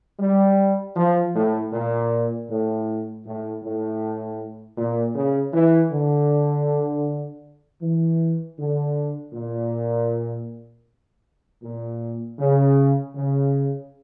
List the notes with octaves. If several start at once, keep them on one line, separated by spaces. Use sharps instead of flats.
G3
F3
A2
A#2
A2
A2
A2
A#2
C#3
E3
D3
E3
D3
A#2
A#2
C#3
C#3